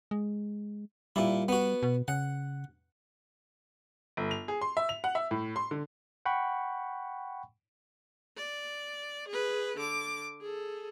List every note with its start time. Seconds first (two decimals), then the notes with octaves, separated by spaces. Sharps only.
0.11 G#3
1.16 A#2 G3 E4
1.49 B3 F#4
1.82 B2
2.08 C#3 F#5
4.17 G1
4.31 F7
4.48 G#4
4.61 C6
4.77 E5
4.89 F7
5.04 F#5
5.15 E5
5.31 A2
5.56 C6
5.71 D3
6.26 F#5 G5 B5 C#6
8.38 D5
9.29 G#4 B4
9.78 D3 D6
10.41 G#4 A4